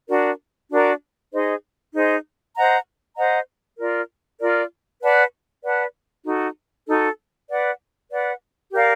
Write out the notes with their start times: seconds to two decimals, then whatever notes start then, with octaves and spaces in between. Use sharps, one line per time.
0.09 D4 F#4 A#4 D5
0.70 D4 F#4 A#4 D5
1.33 D#4 G#4 C5 D#5
1.95 D#4 G#4 C5 D#5
2.56 C5 D#5 F#5 A#5
3.17 C5 D#5 F#5 A#5
3.79 F4 A#4 D5
4.40 F4 A#4 D5
5.02 B4 D5 F#5 A5
5.64 B4 D5 F#5 A5
6.26 D#4 F#4 A4
6.87 D#4 F#4 A4
7.48 B4 D5 F#5
8.11 B4 D5 F#5
8.72 G4 A#4 D5 F5